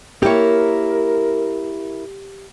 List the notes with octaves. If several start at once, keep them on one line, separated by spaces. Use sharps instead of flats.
A#3 E4 G4 A#4 C#5